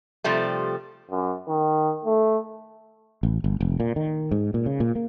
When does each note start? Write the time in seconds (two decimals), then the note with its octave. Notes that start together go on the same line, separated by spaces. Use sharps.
0.24 C3 F3 G3 A3
1.11 F#2
1.48 D#3
2.05 A3
3.23 A1
3.44 G1
3.61 F1
3.80 A#2
3.96 D#3
4.31 G#2
4.54 A#2
4.66 C#3
4.80 A#2
4.95 A#3